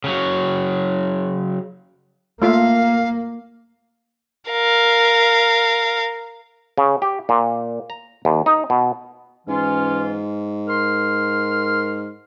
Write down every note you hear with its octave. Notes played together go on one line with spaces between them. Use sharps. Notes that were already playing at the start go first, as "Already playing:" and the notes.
C#3 F#3
A3 A#3 F4 E5 F5
A#4 F5
C#3
G4
A#2
A#5
D#2
D#4
B2
G#2 E3 C#4 F4
A#4 C6 F6